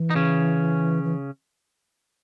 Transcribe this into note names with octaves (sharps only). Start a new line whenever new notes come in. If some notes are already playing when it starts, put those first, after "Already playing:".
Already playing: E3
D#4
C#3 C#4
E3